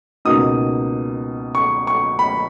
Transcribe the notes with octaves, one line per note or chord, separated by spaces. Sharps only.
C#2 B2 A#3 D#4 D#6
C#6
C#6
B5